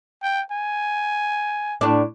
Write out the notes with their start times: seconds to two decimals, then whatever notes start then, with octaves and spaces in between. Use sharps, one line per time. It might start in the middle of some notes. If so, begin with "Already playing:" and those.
0.23 G5
0.52 G#5
1.81 A2 D4